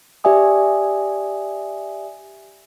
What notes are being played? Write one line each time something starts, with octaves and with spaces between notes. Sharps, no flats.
G4 D5 E5 G#5 D#6